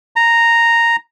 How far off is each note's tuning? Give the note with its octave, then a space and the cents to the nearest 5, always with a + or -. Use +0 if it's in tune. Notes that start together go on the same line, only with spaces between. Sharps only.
A#5 -5